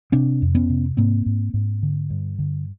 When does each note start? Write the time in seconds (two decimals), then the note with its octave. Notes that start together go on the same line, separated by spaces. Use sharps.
0.12 C3 C4 D4
0.42 F2
0.55 B3 C#4
0.70 C3
0.97 G#2 A#3 C4
1.26 G#2
1.54 G#2
1.83 D3
2.10 G2
2.39 D3